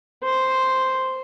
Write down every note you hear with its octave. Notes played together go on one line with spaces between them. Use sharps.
C5